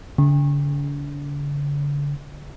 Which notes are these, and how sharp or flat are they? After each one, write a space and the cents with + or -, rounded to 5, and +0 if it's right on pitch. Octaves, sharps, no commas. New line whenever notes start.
D3 -40